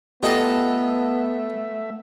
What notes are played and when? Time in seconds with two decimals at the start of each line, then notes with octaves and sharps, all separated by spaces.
0.23 A3 B3 F4 G4 A4 D#5 E5